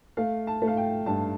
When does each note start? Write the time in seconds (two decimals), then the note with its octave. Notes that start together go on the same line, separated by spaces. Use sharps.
0.17 A3 F5
0.47 A5
0.62 A3
0.68 F5
0.77 G5
1.06 G2 A5